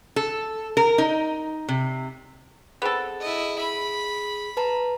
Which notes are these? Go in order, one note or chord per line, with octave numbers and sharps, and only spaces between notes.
A4
A#4
D#4
C3
B3 C4 G#4 A4
E4 D#5
B5
B4 A5 A#5